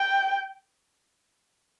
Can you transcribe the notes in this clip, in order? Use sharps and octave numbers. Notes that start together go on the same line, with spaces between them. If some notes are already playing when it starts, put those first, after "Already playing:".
Already playing: G5